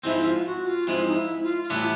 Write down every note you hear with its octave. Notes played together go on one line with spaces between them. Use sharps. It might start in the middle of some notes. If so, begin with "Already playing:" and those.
G#2 F3 G#3 C4 E4
F4
F#4
F4
G#2 F3 G#3 C4 E4
D#4
E4
F4
F4
A2 E3 G3 B3 D4 E4